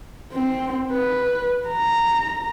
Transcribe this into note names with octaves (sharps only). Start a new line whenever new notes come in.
C4
B4
A#5